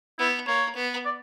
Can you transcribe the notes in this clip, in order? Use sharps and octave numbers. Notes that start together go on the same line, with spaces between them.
B3 E4
A#3 C#5
B3
D5